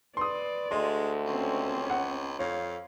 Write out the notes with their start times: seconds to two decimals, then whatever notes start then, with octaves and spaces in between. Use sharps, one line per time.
0.17 B4 D5 C6 D#6
0.71 D2 G#3 D#5 C6
1.26 C#2 C4 C#4
1.90 F#5
2.39 F2 C#5 F5